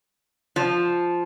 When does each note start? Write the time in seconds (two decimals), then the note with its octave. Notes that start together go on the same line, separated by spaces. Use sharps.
0.56 F3